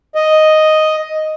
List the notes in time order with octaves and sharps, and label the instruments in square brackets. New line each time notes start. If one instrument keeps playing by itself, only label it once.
[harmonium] D#5